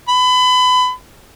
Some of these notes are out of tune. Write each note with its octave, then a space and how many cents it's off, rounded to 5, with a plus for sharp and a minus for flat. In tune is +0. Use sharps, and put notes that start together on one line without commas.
B5 +30